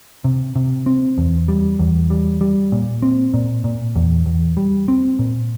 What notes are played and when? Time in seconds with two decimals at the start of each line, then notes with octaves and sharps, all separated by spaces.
0.24 C3
0.56 C3
0.86 C4
1.18 E2
1.48 G3
1.79 E2
2.10 G3
2.41 G3
2.72 A#2
3.02 C4
3.34 A#2
3.64 A#2
3.96 E2
4.26 E2
4.57 G3
4.88 C4
5.19 A#2